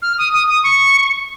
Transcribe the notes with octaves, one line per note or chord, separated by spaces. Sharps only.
F6
D#6
D#6
D#6
C#6